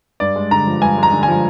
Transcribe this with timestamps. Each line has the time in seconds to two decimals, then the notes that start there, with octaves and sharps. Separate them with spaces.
0.20 G2 D5
0.36 G#3
0.51 D3 A#5
0.67 F3
0.82 G2 G#5
0.98 G#3
1.03 A#5
1.12 D3
1.23 G#5
1.28 F3